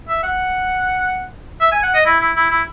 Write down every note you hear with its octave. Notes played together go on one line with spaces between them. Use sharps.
E5
F#5
E5
G#5
F#5
D#5
E4
E4
E4
E4